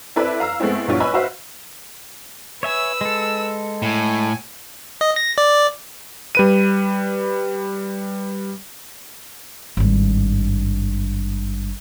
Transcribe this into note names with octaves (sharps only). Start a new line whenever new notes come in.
C4 E4 A4 B4 D5 E5
F5 A#5 E6
G#3 A3 B3 C4 E4
A#1 G2 B3 E4 F4 C#5
B4 C#5 D#5 G#5 B5 E6
F#4 B4 C5 E5 F5
B4 C#5 E5 G#5 E6
G#3 A4
A2 G#5
D#5
A#6
D5
G3 B4 D#7
G#1 G2